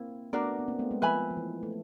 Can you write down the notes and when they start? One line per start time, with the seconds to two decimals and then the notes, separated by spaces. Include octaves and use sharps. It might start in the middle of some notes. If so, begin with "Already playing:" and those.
Already playing: A#3 C4 E4
0.33 A3 B3 D4 F#4 A#4 D5
0.59 B3
0.68 A#3 C4
0.79 A3 B3
0.91 G#3 A#3
1.02 F3 B4 E5 G#5 B5
1.31 F3
1.37 E3
1.63 A3